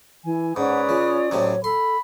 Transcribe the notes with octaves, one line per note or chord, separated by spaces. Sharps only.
E3 G#5
G#2 C#4 B4 D5 F#5 D#6
C#3 F4
A2 C3 F#3 C#5
A4 B5 C6